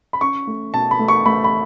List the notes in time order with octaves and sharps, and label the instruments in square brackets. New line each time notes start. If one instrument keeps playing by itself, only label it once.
[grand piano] B5
C#4 C#6
A3
B2 A5
B5
A3
C#6
A3 B5
B5